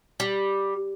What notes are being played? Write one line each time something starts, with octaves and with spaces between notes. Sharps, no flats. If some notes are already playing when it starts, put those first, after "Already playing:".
G3